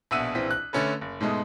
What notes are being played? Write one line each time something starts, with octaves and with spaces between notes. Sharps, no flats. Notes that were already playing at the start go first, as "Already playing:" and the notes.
A#1 B2 E5 F#5 E6 D#7
A#1 E3 C4 B6
F#6
D3 A3 C#4 A4 B4
F#1
G#2 B2 G#3 A3